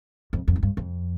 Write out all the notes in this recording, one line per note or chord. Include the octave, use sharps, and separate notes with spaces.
F2
F2
G#2
G2
F2